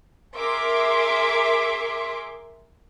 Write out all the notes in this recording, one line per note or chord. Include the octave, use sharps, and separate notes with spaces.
G#4 A#4 E5 C6 D6